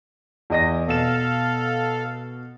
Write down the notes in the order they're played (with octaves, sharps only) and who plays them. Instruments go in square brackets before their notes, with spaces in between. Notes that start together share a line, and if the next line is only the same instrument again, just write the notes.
[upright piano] E2 D#5 A#6
[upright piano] B2 E7 [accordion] A4 F5